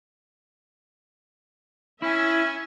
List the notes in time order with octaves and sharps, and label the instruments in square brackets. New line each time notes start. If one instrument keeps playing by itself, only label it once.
[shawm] C#4 [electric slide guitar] E4 [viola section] E5 G#5